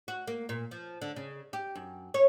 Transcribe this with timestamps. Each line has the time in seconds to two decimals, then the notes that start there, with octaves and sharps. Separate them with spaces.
0.08 F#4
0.28 A#3
0.49 A#2
0.71 F3
1.01 D3
1.16 C#3
1.53 G4
1.75 F#2
2.14 C#5